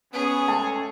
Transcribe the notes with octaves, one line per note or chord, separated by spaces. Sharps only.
B3 C#4 G#4 C#5
G#3 A3 A5